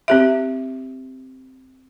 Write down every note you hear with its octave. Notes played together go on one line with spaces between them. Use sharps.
C4 G4 E5